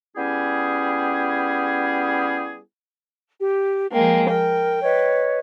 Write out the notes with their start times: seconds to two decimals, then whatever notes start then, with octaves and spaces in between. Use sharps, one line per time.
0.16 G3 B3 C#4 E4 G4 G#4
3.39 G4
3.92 F3 G#3 A#3 G5
4.30 A#4 G5
4.82 B4 C#5 D#5